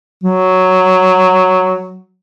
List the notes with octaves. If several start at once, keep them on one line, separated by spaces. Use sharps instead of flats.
F#3